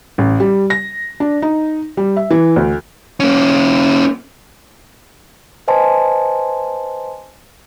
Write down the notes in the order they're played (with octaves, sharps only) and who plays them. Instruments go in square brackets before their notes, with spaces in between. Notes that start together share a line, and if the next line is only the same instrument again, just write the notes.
[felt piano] A1
G3
A#6
D4
D#4
G3
E5
E3
D2
[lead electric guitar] A#3 C#4
[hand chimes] B4 C5 D#5 G#5 A5 C6